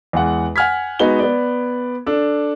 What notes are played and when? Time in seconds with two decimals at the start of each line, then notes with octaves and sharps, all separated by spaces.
0.13 E2 G#3 F#5
0.56 F#5 G#5 F6 G#6 B6
0.99 G#3 B3 D#4 F#4 G7
1.19 B3 D5
2.06 D4 A4